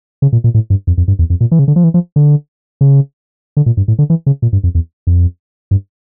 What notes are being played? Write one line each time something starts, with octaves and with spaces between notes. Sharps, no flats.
C#3
A#2
A#2
A2
G2
F2
F2
G2
E2
F2
A#2
E3
C#3
D3
F3
E3
F3
D3
C#3
D3
A#2
G2
A2
D3
E3
C#3
A#2
G2
F2
E2
F2
G2